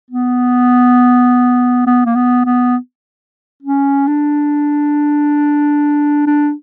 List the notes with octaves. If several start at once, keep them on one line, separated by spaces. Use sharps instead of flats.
B3
B3
A#3
B3
B3
C#4
D4
D4